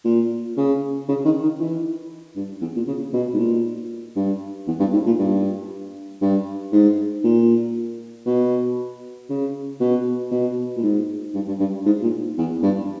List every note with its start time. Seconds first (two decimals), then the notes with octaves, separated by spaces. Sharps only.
0.05 A#2
0.57 C#3
1.09 C#3
1.25 D#3
1.43 D#3
1.60 E3
2.36 G2
2.61 E2
2.75 A#2
2.87 C#3
3.13 B2
3.34 G#2
3.38 A#2
4.16 G2
4.67 E2
4.80 G2
4.93 G#2
5.06 A#2
5.19 G2
6.21 G2
6.72 G#2
7.24 A#2
8.26 B2
9.30 C#3
9.80 B2
10.31 B2
10.77 A#2
10.83 G#2
11.34 G2
11.47 G2
11.60 G2
11.86 G#2
12.02 A#2
12.38 E2
12.62 G2